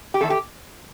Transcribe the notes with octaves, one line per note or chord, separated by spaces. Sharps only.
G4
E2 D#3 A3 E4 A4
G4